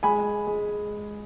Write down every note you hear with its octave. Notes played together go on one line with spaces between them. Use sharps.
G#3 G#5 B5
G#3